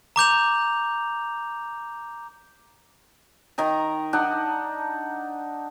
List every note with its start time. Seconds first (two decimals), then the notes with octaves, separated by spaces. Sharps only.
0.16 A#5 D6 G6 F7
3.58 D#3 D#5 A#5
4.13 D4 D#4 F#5